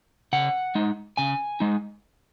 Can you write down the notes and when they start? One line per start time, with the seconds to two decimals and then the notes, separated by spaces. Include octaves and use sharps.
0.33 C#3 F#5
0.75 G#3 D#4
1.17 C#3 G#5
1.60 G#3 D#4